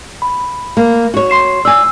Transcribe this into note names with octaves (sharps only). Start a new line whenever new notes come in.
B5
A#3
F#4 C#5
C6 C7 E7
D5 G#5 E6